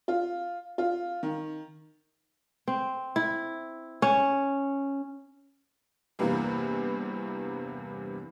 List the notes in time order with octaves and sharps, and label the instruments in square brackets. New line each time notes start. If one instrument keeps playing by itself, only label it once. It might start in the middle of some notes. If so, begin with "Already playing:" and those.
[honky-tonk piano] F4
F4
D#3
[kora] C4
E4
C#4
[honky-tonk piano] E2 G2 C3 E3 A#3